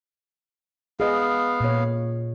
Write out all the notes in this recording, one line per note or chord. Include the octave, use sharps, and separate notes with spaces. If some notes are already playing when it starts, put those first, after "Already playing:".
B3 G#4 D#5 F5
A#2 C#5